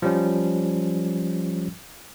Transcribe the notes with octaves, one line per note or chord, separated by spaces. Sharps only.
F3 G3 C#4